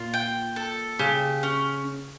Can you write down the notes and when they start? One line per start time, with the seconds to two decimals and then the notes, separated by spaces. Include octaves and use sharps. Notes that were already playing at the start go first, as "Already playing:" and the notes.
Already playing: A#2 F4
0.14 G5
0.56 A4
0.99 C#3 G4
1.43 C#4